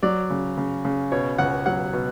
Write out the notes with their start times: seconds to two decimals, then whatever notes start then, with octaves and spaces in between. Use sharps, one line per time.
0.03 F#3 D5
0.30 C#3
0.57 C#3
0.85 C#3
1.12 B2 C#5
1.38 C#2 F#5
1.66 F#3 F#5
1.93 B2